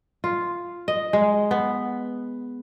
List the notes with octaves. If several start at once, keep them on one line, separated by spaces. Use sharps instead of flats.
F4
D#5
G#3
B3